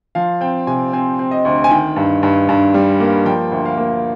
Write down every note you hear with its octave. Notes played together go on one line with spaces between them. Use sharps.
F3 F5
C4 G5
C3 G#5
C4 G#5
C4
D#5
D2
G#5
D#3 G5
G2
G2
G2
G3
A#3
F3 G5
D2 G5
F5
A#3